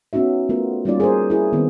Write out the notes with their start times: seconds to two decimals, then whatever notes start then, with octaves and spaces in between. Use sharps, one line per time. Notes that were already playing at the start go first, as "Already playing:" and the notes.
0.13 B3 C#4 D#4 F#4 E5
0.49 A3 B3 F4 A#4
0.85 G3 A#3 C#4 D#4 F4 D5
1.00 G#4 A#4 C5
1.30 E4 G#4 A#4
1.52 D#3 B3 C4